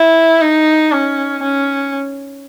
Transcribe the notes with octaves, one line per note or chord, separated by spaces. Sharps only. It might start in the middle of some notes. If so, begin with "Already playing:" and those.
Already playing: E4
D#4
C#4
C#4